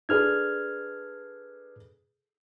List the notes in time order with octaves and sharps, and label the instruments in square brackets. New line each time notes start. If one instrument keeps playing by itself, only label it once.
[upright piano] D4 G#4 A4 [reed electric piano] B4 F6 G#6